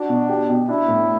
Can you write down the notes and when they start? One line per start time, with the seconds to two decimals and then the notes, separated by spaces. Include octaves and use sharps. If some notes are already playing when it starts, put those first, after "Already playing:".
Already playing: D4 F#4
0.09 B2
0.29 G4
0.49 B2
0.69 D4 E4
0.88 A2